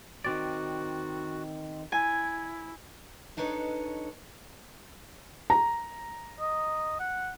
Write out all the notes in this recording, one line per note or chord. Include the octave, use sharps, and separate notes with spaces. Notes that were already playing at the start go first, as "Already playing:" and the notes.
D#3 C4 F#4 D5
E4 G#5
D4 D#4 A4 B4 C#5 D#5
A#5
D#5
F#5